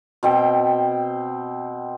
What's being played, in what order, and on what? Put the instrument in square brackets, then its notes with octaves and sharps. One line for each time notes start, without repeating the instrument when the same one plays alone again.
[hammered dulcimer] B2 C4 G5